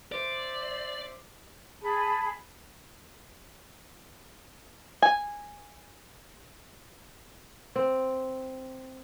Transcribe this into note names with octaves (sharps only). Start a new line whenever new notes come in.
C5 D5 E5 D6
G#4 A5 B5
G#5
C4